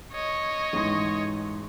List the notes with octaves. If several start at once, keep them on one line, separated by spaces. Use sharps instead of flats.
C#5 D#5
A1 G#2 C6